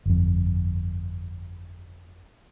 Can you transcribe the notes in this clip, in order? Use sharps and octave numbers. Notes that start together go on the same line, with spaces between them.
G1 F2